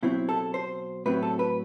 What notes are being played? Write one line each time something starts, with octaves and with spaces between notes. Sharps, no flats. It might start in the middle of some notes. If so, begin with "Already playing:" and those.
B2 F#3 C4 E4
A4
C5
A2 F#3 C4 B4
A4
B4